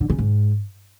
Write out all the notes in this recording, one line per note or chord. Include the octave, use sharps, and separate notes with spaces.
D3
C#3
G#2